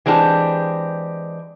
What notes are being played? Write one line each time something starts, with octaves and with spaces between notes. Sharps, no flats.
E3 G#3 C4 D4 G4